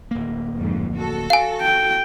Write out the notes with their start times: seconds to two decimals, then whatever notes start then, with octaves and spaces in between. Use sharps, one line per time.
0.11 D1 A#3
0.57 F2 G#2
0.96 F#4 A4
1.30 F5 G#5
1.61 G5